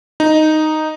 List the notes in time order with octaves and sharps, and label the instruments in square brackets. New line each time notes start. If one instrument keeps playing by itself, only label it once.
[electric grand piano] D#4